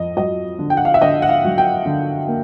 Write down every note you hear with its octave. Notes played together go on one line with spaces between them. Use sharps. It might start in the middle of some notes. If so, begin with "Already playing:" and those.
Already playing: F2 D#5
F#3 D#5
D3
G5
F#5
F5
E5
D3 D#5
F#5
F5
F#3
G5
D3
A#3